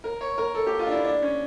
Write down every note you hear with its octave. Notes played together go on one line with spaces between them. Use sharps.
A#4
C#5
A#4
A4
G4
F4
D4
E4
D4
C#4